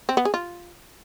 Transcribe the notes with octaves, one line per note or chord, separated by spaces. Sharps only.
C4
B3
G#4
F4